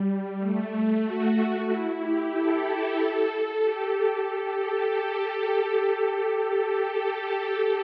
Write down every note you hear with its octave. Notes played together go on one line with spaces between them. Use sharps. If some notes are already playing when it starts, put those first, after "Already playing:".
Already playing: G3
A3
F#4
E4
G4
A4
G4